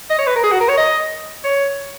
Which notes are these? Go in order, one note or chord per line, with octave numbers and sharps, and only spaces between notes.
D#5
C#5
B4
A#4
G#4
F#4
A#4
C#5
D#5
C#5